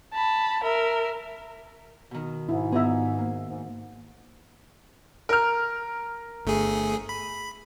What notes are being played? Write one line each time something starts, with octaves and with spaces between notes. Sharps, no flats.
A5 B5
A#4 E5
B2 D#3
G#2 E4
B3 F4 G#4 D#5 E5 A#5
A#3
G#2
A#4 F6
G1 A3 G#4
B5